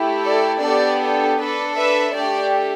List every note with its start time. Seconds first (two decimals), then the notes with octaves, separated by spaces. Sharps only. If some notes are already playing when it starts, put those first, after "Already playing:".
Already playing: A3 E4 G4
0.26 A4 D5
0.63 B3 D4 G4 A4 D5
1.01 A4
1.39 D4 A4 B4
1.77 B4 E5
2.14 A3 D4 G4 D5 G5